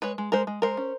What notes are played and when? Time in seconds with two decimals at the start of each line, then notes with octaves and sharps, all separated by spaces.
0.02 G#3 B4 C#5
0.18 G#3
0.32 G#3 A#4 C5
0.47 G#3
0.62 G#3 A#4 C5
0.77 C#4